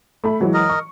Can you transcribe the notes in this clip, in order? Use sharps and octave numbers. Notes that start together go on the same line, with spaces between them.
A3 B5
E3 F#3 G#3
A#4 D#5
C#6